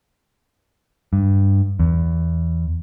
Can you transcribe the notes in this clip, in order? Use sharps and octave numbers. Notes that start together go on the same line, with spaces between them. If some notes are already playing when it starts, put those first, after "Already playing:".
G2
E2